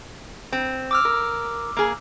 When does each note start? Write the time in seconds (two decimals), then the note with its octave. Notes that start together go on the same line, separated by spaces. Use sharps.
0.52 C4
0.91 D6 E6 F6
1.05 A#4
1.77 A#3 G#4